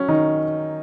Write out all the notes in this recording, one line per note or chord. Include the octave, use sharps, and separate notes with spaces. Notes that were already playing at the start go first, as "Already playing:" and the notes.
Already playing: F#3 C#4
D#3 D#4